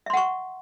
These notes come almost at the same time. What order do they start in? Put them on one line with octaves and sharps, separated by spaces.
E5 C6 F#5 C#6